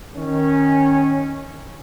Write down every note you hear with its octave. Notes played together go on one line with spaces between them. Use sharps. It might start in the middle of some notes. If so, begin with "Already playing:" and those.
D#3 C#4